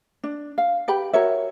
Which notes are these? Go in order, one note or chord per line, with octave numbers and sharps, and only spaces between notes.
D4
F5
G4 B4 G5 B5
F#4 A#4 C#5 E5